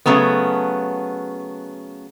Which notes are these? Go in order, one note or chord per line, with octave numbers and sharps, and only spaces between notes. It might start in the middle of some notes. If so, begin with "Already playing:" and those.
C#3 F#3 A3 B3